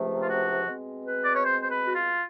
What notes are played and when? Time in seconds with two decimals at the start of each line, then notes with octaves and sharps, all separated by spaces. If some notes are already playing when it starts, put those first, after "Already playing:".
Already playing: C#2 C3 F3 A3
0.22 F4
0.29 F#4
0.67 B2 G#3 C4
1.06 B4
1.23 D5
1.34 C#5
1.44 C5
1.61 C5
1.69 B4
1.87 F#4
1.95 F4